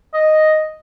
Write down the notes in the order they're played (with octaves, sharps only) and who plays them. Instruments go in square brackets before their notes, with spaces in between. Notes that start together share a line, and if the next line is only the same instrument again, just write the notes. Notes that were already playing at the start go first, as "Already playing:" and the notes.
[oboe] D#5